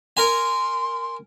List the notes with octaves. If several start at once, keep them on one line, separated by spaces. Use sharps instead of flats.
A#4 G#5 C6